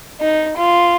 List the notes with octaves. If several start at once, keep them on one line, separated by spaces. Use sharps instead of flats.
D#4
F4